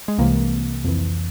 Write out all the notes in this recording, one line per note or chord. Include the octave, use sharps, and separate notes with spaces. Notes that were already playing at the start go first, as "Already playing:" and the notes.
G#3
C2 C3 E3 A#3
F2 E3